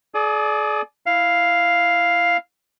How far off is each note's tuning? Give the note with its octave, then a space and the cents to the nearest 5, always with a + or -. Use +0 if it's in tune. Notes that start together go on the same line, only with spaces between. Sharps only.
G#4 +45 D5 +0 D#6 +0
E4 +0 F5 +0